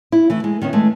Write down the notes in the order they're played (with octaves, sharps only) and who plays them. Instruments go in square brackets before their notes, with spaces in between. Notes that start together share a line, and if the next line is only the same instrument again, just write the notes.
[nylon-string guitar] E4
E3 A3 E4
G#3
D#3 B3 C#4
E3 G#3 A3